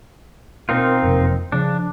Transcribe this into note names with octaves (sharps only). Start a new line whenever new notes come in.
B2 C4 D#4 F4 A#4
F#1 F2 C3
C#3 F3 D4